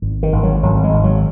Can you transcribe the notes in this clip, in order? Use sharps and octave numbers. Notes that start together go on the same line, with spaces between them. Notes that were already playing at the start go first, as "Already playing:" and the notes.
G#1
D#3
G#1
F#3
G#1 F#3
G#3
G#1
F#3